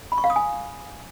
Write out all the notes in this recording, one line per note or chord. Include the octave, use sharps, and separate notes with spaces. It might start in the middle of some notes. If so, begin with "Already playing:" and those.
B5
C#6
F5
D#6
G#5